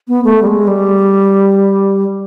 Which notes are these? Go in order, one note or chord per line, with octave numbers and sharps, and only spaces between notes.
B3
A3
G3
G#3
G3